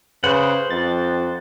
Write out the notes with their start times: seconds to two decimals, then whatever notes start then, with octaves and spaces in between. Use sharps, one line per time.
0.24 C#3 B4 C5 F#5
0.70 F2 A6